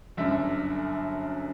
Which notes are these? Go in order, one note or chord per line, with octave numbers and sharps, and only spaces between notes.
G1 F#2 D3 E5